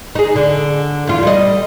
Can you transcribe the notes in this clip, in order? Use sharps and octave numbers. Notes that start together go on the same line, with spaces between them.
D#4 G#4
D3
E2 F4
G3 D#5